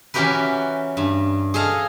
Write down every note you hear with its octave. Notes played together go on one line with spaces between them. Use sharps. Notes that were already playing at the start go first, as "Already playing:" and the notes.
E3 C#4 F#4 G4 A#4 B4
G2
G#4 A4 D#5 F5